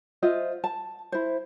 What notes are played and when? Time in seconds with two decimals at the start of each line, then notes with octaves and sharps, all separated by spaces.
0.22 F4 C5 D#5 E5
0.64 A5
1.12 E4 C5